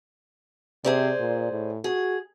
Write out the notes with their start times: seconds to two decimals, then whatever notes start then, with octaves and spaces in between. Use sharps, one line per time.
0.85 C3 G#4 C5 D5
1.20 A#2
1.52 A2
1.84 F#4 G#4